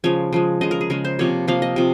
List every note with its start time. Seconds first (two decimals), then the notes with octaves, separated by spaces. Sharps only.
0.04 C#3 F3 G#3 C#5
0.33 C#3 F3 G#3
0.61 C#3 G#3 D#5
0.71 A#4
0.81 G#4
0.90 C#3 G#3 A#4
1.05 C5
1.19 C3 F3 A#3 C#5
1.47 C3 F3 A#3 F5
1.62 D#5
1.76 C3 F3